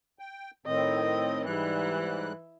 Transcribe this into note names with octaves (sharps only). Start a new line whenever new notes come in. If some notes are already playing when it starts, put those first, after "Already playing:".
G5
A2 D#3 C4 D#5
G#2 E3 G3 F#6